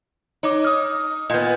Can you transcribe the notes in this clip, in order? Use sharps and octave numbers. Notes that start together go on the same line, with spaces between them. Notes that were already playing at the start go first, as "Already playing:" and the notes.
D#4 C#5 D#5 D6
D#6 F6
A#2 B3 D#5 G6